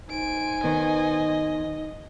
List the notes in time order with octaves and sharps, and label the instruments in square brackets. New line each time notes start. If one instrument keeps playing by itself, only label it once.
[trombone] D#4 [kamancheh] C5 G#5 [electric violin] D7
[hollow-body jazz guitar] D#3 B3 [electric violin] D#5